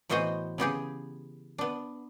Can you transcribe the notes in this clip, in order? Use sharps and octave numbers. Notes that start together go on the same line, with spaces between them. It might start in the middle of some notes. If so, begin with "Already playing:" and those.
A2 E3 B3 F#4 C5 D#5
C#3 B3 G4 G#4
B3 D4